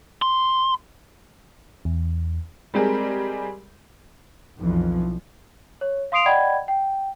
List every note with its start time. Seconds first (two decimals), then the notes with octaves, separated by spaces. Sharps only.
0.22 C6
1.85 E2
2.74 G3 G#3 C4 G4 G#4 A#4
4.59 B1 F2 E3 F3
5.81 C#5
6.12 F5 C6 D#6 C7 D7 F7
6.26 D5 D#5 F#5 G5 B5 G#6
6.68 G5